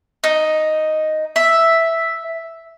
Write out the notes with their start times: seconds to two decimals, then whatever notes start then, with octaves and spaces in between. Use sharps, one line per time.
0.24 D#4
1.36 E5